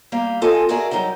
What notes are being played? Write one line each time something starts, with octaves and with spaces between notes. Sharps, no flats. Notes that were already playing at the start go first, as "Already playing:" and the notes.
G3 A#3 F5
G#3 C4 F4 A4 D#5 G#5
F#4 G#4 A#4 D5 E5
F#3 G3 D#4 G5